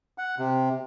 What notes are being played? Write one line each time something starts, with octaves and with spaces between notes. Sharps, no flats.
F#5
C3